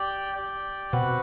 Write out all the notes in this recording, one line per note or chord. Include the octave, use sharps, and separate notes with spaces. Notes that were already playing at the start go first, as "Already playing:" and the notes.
Already playing: G4 D5 G5
G4 D5 G5
B2 C4 F#4 B4 F#5